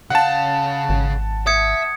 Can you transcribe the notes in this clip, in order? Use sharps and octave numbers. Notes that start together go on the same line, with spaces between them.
C#3 F5 F#5 A5
G#1
E5 D#6 G#6 C#7